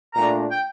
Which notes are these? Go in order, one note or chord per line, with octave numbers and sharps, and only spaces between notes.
A#2 A3 D4 A#5
G5